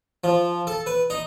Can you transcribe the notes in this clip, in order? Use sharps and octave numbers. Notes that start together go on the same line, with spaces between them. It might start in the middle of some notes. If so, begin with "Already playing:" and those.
F3
A4
B4
D#4